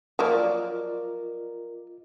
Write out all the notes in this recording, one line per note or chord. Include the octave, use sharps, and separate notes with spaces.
F3 F#3 A#3 F4 A#4 D5 D#5